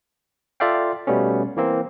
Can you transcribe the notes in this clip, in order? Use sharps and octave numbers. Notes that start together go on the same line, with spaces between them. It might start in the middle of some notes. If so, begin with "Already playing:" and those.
F4 A4 D5 E5 F5 G5
B2 G3 A3 B3 C#4
E3 A#3 C4